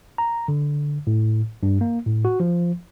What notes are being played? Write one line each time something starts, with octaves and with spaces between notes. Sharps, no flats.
A#5
D3
A2
G2
A#3
A2
F#4
F3